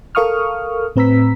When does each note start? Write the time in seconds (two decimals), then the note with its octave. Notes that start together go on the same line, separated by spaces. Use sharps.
0.15 A4 A#4 F5 C#6 D#6 F6
0.96 A2 C4 B4 A#5 E6 B6